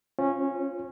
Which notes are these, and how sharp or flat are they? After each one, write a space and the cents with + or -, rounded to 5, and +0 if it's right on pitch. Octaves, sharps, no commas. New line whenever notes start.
C#4 -15 F4 +0 C5 +15